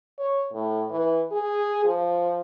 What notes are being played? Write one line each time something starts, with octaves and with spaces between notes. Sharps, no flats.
C#5
A2
E3
G#4
F3